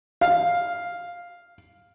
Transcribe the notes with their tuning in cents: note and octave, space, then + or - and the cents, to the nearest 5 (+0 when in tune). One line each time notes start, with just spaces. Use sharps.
F5 +5